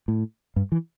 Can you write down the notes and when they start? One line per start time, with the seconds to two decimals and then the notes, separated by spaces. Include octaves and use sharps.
0.08 A2
0.56 G2
0.72 E3